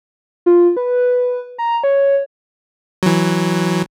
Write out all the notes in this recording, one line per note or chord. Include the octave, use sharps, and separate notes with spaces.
F4
B4
A#5
C#5
E3 F#3